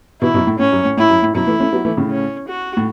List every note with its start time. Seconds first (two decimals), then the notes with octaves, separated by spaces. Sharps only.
0.22 B2 E3 E4
0.34 F#2 B2
0.47 A2
0.59 A2 C#4
0.72 F#2
0.85 A2
0.97 A2 E4
1.09 F#2
1.22 A2
1.34 F#2 B2 E4
1.47 E3 A3
1.60 A3 C#4
1.72 F#3 B3
1.85 E3 A3
1.97 A2 C#3
2.11 C#4
2.48 F#4
2.77 A2